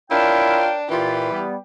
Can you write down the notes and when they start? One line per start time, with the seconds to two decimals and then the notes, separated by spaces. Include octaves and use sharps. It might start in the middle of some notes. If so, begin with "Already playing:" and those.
0.11 D4 E4 F4 A#4 C#5 G5
0.90 A#2 E3 F4 G4 B4
1.31 G3 B3